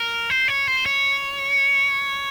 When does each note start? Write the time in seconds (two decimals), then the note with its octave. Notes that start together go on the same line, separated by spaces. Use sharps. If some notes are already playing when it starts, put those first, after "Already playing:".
Already playing: A#4
0.30 C5
0.48 C#5
0.67 C5
0.86 C#5